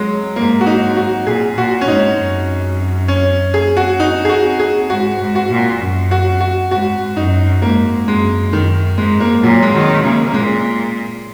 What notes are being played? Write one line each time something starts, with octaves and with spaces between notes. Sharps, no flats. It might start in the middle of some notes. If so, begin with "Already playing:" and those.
Already playing: F#3 G#3
G#2 A#3
F#4
D#4
F#4
A#2 G#4
A#2 F#4
C#4
G#2 D#4
F#2
C#4
G#4
F#4
D#4
G#4
F#4
G#4
G#2 F#4
G#2
F#4
A#2
F#2
F#4
F#4
G#2 F#4
F#2 D#4
G#2 A#3
F#2 G#3
F#2 D#3
G#2 G#3
A#3
A#2 F#3
G#3
D#3 F#3
C#3 A#3
A#3
A#2 G#3